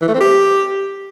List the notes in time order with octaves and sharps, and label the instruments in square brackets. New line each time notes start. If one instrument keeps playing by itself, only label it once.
[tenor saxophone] E3
A3
C4
G4